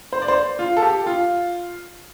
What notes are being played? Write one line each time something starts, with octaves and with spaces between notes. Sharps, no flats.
C5
D5
C5
F4
A4
G4
F4